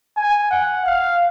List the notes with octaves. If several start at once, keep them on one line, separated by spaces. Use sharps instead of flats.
G#5
F#5
F5